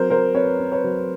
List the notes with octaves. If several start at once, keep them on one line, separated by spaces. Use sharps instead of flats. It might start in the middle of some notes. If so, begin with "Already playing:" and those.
Already playing: F#3 C4 A#4 C5
F#3 A#4 C5
C4 B4 C#5
C4
B4 C#5
F#3